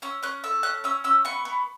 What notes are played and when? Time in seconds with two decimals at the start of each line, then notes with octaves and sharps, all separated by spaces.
0.02 C#4 E6
0.23 C#4 F#6
0.44 A4 E6
0.63 C#4 F#6
0.84 C#4 E6
1.04 C#4 E6
1.25 B3 C#6
1.45 B3